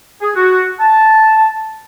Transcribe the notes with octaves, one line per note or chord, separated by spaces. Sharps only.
G#4
F#4
A5